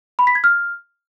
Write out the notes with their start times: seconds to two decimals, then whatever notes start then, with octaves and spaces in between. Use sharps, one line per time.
0.19 B5
0.27 B6
0.35 G#6
0.44 F6